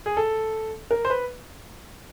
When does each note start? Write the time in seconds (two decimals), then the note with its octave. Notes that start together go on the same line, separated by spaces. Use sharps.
0.06 G#4
0.17 A4
0.91 A#4
1.05 C5
1.10 B4